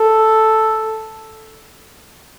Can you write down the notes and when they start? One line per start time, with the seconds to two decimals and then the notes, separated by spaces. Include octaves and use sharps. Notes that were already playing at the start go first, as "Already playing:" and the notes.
Already playing: A4